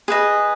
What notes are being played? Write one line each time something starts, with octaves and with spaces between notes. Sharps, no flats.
G#4 B4 D#5